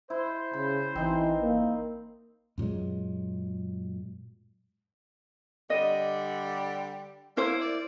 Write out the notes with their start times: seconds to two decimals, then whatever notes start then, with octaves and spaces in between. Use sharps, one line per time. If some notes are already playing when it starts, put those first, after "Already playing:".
0.10 E4 C5
0.53 C#3 B5
0.95 A1 E3 C4 D#4
1.42 A#3
2.58 F#2 A#2 F#3 G#3
5.70 D3 G3 D#5
7.37 A#3 E4 C5
7.60 D5